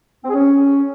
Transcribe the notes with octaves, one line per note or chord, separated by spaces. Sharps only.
C4
G#4
C#4